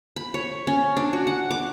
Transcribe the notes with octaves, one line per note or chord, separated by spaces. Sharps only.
B5
C#5
C#4
D4
F#4
F#5
D6